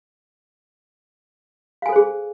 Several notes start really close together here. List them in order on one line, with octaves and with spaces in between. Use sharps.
F5 G#5 A4 C5 G#4